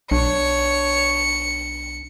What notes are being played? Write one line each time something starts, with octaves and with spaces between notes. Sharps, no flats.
B1 D4 C#5 C#7